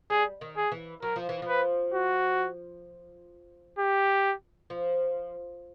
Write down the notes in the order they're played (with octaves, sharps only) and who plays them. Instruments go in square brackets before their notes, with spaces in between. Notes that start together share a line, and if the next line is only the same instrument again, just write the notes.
[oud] G3 [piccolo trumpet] G#4
[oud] D#3
[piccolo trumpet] G#4
[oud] E3
[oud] F#3 [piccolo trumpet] A#4
[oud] F3
E3
F3
[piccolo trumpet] B4
F#4
G4
[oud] F3